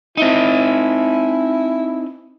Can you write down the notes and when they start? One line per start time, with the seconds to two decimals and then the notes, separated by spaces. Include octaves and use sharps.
0.17 C4 D#4 E4